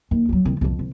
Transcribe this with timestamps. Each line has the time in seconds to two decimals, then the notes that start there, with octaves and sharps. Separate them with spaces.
0.11 D#2
0.29 F#3 G#3
0.45 C2 F2
0.61 C2 F2
0.79 C2